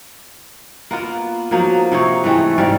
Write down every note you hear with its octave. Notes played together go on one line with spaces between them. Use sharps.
A#3 B3 F4
F3 F#3 A#3 D#4
C3 D#4 C#5
E3 G#3 A3 C4
G#2 G3 D5 F5